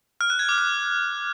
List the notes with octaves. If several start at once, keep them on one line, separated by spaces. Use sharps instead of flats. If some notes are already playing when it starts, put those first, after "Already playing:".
F6
F#6
G#6
D6
F#6